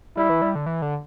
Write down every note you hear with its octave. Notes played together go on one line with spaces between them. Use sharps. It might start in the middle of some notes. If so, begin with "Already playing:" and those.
G3 E4
E3
G3
D3
E3
D3